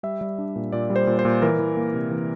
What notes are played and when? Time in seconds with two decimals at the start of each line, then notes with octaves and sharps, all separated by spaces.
0.03 G3 E5
0.21 G3
0.38 D4
0.56 A#2
0.72 A#2 D5
0.90 G3
0.96 C5
1.07 A#2
1.19 C5
1.25 A#2
1.42 E3 A#4
1.59 E3
1.77 A#3
1.94 C3
2.11 E3